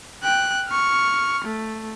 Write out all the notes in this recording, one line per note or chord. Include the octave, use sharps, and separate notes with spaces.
G5 F#6
C#6 F6
A3